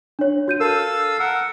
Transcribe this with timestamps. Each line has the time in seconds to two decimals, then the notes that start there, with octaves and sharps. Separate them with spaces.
0.19 D4 C#5
0.48 F#4 G6 D#7
0.60 A4 A#4 F5 E6
1.20 A#4 F#5 E6